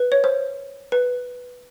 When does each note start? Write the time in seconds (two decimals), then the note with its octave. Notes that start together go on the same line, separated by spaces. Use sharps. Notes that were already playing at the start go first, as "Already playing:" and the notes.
Already playing: B4
0.12 C#5
0.24 C5
0.92 B4